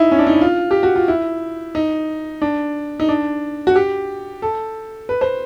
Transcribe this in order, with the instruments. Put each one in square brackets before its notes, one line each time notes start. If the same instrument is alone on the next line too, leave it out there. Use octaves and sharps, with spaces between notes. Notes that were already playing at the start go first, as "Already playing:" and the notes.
Already playing: [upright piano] D#4 E4
C#4
D4
D#4
E4
F4
G4
F#4
F4
E4
D#4
D4
D#4
D4
F#4
G4
A4
B4
C5